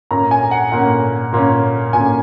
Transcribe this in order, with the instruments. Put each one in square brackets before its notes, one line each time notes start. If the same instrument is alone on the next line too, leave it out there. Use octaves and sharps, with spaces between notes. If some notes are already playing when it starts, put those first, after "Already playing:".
[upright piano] A#2 A#3 C#4 A#5
G#5
F#5
A#2 A#3 C#4 F#5
A#2 A#3 C#4
A#2 A#3 C#4 G#5